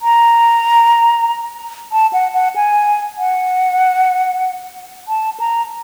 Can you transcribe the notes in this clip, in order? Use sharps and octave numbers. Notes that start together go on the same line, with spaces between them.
A#5
A5
F#5
F#5
G#5
F#5
A5
A#5